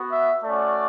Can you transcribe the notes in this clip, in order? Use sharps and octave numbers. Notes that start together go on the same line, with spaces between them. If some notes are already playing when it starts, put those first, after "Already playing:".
Already playing: B3 F#4
E5
A3 C#4 F#4 D5